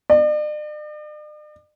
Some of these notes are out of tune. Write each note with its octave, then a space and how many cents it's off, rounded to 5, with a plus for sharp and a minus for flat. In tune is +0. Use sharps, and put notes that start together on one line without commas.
D5 +45